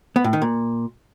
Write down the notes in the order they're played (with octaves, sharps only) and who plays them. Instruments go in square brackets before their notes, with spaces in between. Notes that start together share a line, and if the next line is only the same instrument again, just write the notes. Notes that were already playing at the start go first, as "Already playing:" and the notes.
[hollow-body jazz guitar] B3
A2
D#3
A#2